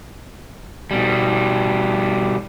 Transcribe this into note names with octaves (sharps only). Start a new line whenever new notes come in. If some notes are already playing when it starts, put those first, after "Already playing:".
B2 G3